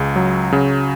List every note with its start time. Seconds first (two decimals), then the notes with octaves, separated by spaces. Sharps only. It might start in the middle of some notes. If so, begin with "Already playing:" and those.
Already playing: C#2 C#3
0.16 F#3
0.52 C#3